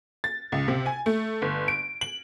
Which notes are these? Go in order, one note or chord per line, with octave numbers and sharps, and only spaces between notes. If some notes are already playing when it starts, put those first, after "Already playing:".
A6
C#2
C3
G#5
A3
G1
D7
F#7